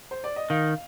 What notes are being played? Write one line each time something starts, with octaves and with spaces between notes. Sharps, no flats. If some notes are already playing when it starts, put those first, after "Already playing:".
C5
D5
D#5
D#3 F5